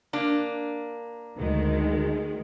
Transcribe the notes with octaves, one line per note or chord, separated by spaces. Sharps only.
A#3 D4
D2 D#3 G#3